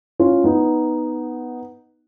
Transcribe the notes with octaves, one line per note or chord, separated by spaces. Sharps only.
C#4 F4
B3 D#4